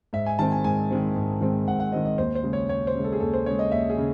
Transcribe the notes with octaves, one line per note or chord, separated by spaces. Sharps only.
G#2 E5
G#5
D#3 G#3 C4 A5
G#5
G#2 G#5
D#3 G#3 C4
G#2
D#3 G#3 C4
G#2 F#5
F#5
D#3 G#3 C4 D#5
D#5
D#2 C5
C5
C#3 G#3
C#5
D#2 C#5
C5
C#3 G#3
A4
G#4
D#2 A4
C5
C#3 G#3 C#5
D#5
D#2 E5
G#4
C#3